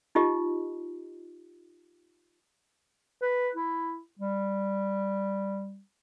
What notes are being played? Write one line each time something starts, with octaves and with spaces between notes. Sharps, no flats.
D#4 F4 G4 D#5
B4
E4
G3